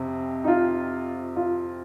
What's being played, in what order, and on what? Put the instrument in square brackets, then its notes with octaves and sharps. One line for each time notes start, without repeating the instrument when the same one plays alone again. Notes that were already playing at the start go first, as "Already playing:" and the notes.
Already playing: [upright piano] F2 C3
[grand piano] D#4
F4
F4